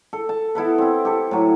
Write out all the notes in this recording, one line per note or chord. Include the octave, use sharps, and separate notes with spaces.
A4
A5
B3 E4 A4 B4
C4 E4
G4 A4
A2 F#3